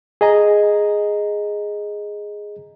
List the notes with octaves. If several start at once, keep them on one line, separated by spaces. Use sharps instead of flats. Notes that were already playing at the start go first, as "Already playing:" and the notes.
G#4 D#5 A#5